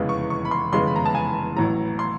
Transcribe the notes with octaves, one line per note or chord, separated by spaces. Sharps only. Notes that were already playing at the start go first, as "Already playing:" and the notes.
Already playing: F1 E2 C#3 E3 G#3
C#6
C#6
B5
C6
F1 E2 C#3 E3 G#3 C6
B5
A#5
A5
G#5
A1 A2 F#3 A#5
C6